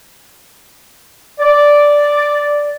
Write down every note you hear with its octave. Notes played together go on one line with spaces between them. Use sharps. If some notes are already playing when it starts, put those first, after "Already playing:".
D5